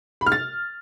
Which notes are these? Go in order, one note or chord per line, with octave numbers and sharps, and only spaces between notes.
B5
F6
A6